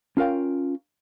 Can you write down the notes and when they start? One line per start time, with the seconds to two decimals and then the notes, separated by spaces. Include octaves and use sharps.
0.17 C#4 F4 A#4 F5 G5